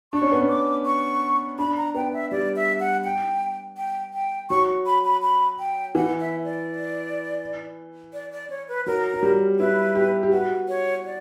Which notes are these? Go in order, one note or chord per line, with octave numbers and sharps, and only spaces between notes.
D4 C#6
C#4
B3
C#4
D6
C#6
D4 B5
A#5
B3 G5
E5
G3 D5
E5
F#5
G5
G5
G5
F#3 C#6
B5
B5
B5
G5
E3 F#5
E5
D5
D5
D5
C#5
B4
F#3 A#4
F#3
G3
E4 B4
G4
G4
F#4 B4
C#5
D5